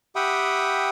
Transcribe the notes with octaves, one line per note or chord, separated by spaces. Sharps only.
G4 E5 F#5 G5 B5 D#6